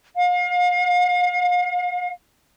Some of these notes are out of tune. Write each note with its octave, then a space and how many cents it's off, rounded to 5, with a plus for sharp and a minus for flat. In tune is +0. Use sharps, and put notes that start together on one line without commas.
F5 +40